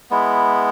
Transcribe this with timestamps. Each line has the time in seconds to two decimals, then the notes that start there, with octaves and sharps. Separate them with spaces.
0.11 G#3 B3 E4